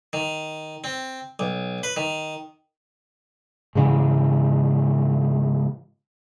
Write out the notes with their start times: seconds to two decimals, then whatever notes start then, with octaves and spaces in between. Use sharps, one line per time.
0.13 D#3
0.84 C4
1.39 B1
1.83 B4
1.96 D#3
3.75 G#2 C#3 E3